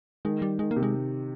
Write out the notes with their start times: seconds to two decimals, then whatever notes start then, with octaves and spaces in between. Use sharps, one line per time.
0.25 D#3 G#3
0.42 G3
0.59 D#3 G#3
0.71 A#3
0.76 C3
0.83 G#3